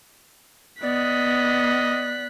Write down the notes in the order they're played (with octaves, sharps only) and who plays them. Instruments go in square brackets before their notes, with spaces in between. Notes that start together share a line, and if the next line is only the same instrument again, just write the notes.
[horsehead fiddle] B3 [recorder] D5 [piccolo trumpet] D#5 [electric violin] F#6 B6